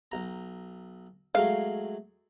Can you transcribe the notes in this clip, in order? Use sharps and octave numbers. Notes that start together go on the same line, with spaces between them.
B1 A#5
F#3 G#3 A3 F5